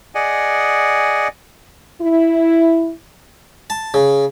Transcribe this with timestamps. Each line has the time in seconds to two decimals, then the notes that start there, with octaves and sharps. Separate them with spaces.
0.15 G#4 D5 D#5 F#5 G#5
2.02 E4
3.70 A5
3.94 C#3